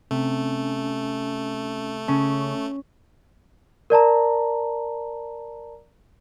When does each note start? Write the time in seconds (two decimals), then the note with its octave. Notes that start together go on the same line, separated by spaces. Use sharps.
0.11 C3 A3 C#4
2.08 C#3 C#4 A5
3.90 A#4 D5 A5 A#5